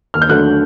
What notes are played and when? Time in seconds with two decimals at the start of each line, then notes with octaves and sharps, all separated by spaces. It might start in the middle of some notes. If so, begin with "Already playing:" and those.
0.14 D#2 F6
0.22 G6
0.29 D3 F#3 A3 F#6